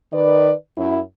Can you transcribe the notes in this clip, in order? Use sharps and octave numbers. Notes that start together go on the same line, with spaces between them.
D#3 B4 D5
F#2 E4